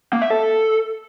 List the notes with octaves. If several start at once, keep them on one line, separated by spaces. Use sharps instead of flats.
A#3
E5
A4